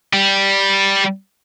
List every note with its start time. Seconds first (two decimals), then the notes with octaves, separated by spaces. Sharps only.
0.13 G3